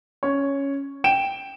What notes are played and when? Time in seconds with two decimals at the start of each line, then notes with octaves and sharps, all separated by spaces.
0.23 C#4 C#5
1.04 G5 D7 E7